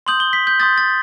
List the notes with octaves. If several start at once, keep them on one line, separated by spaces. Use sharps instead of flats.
C6 D#6 G6 F#7
G7
B6
G6
C6 D#6 G6 A6
A6